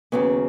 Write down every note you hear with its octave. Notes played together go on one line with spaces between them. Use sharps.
D#2 C#3 F#3 B3